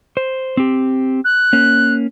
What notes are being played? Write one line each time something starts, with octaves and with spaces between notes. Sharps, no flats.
C5
C4 G4
F#6
A#3 C#4